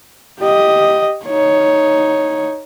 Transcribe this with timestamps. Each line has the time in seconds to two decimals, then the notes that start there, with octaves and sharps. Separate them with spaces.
0.40 G4 D#5
1.26 D#4 C#5